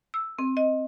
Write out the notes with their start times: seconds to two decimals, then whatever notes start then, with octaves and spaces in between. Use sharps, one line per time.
0.14 E6
0.39 C4
0.57 D#5